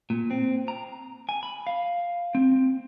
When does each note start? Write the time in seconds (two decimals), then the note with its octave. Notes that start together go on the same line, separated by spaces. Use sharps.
0.10 A#2
0.31 C4
0.68 A#5
1.29 G#5
1.43 B5
1.67 F5
2.35 C4